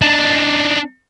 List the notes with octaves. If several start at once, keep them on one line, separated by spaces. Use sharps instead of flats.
D4 D#4